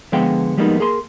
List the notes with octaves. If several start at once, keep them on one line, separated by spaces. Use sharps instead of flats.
D3 F3 G#3 B3 F5 G5
F3 G3 G#3 A#3 B3 D#4
A#3 G#4 A#4 C6